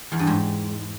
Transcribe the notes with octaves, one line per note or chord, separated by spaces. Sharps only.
E2
G2
G#2